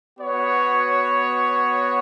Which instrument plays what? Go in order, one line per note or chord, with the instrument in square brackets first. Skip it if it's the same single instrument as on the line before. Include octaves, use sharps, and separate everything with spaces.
[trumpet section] B3 F#4 C#5